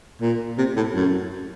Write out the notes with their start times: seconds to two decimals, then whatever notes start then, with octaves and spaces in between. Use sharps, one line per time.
0.21 A#2
0.58 C3
0.77 A2
0.95 F#2